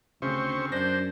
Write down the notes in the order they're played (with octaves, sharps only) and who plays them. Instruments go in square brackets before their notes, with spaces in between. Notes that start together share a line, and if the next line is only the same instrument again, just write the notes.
[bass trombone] D2 [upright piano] C#3 [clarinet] C4 [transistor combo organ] C5 C#6
[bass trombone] F#2 [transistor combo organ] D4 [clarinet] C5 [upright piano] G6 A#6